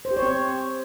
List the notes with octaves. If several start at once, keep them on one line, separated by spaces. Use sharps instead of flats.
C5
G4
C#5
C4